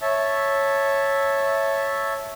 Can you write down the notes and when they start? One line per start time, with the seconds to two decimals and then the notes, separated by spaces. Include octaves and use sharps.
0.01 C#5 E5 A5